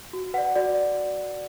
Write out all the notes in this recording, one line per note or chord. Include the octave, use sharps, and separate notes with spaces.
F#4
B4 D5 F#5
F#4 D5